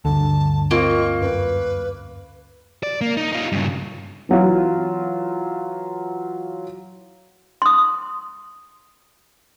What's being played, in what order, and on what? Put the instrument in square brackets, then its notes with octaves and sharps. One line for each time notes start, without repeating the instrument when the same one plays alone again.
[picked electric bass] D2 G2 [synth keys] D3 [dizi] A5
[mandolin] A#3 [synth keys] C4 F4 D#5 [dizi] C#6
[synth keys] F#2 [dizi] B4
[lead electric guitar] D5
A#3
D#4
D#4 F4
G2 C#3
[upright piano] E3 F#3 F4
[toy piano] C6 D#6